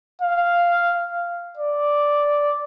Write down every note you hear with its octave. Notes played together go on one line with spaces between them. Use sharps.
F5
D5